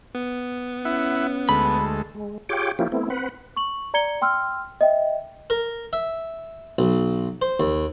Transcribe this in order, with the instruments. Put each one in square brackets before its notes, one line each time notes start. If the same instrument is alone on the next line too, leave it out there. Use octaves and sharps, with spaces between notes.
[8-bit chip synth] B3
[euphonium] C#4 [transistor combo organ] E4 E5 F#5
[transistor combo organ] D2 G#3 A4 [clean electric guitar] B5
[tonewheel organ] G#3
F4 G4 G#4 C#5 G5 D6
F3 A#3 C#4 E4 F4 G4
A3 B3 C4 E4
C4 B4 F#5
[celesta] C#6 F#7
D5 A#5 G#6 C#7 G7
G5 C6 E6 F6
D#5 E5 G5
[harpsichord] A#4
E5
B1
C5
D#2